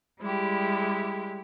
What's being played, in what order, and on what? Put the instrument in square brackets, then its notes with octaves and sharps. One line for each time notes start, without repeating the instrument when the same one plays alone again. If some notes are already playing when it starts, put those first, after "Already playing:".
[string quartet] G3 G#3 E4 G4